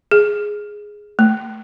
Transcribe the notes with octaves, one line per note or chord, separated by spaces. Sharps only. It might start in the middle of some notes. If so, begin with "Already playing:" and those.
G#4
A3